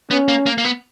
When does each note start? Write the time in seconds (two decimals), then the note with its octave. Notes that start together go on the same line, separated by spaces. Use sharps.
0.11 B3 C#4
0.28 A#3
0.46 A#3
0.58 A#3
0.65 B3